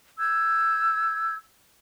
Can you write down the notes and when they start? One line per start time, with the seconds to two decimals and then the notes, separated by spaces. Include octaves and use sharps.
0.18 E6 G6 G#6